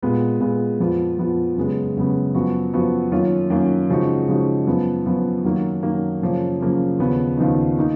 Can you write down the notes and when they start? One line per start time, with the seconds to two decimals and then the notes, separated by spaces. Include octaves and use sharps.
0.02 A#2 G#3 B3
0.40 A#2 G#3 B3
0.80 F2 F3 B3 F4
1.18 F2 F3 B3 F4
1.57 F#2 C#3 G#3 B3
1.96 F#2 C#3 G#3 B3
2.35 F#2 F3 B3 F#4
2.73 F#2 F3 B3 F#4
3.12 F#2 D#3 A#3 C#4 F4
3.50 F#2 D#3 A#3 C#4 F4
3.89 C#3 F3 G#3 D#4 F#4
4.28 C#3 F3 G#3 D#4 F#4
4.67 F#2 F3 B3
5.06 F#2 F3 B3
5.44 F#2 D#3 F#3 A#3
5.83 F#2 D#3 F#3 A#3
6.22 F#2 C#3 F3 A#3 C#4
6.60 F#2 C#3 F3 A#3 C#4
6.99 D#2 C#3 F3 B3 D#4
7.37 D#2 C#3 F3 B3 D#4
7.78 D#3 A#3 D#4